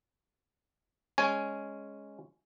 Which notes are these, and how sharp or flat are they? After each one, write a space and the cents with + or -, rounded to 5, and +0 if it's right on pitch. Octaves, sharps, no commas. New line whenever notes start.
G#3 +0 C#4 +0 G#5 +0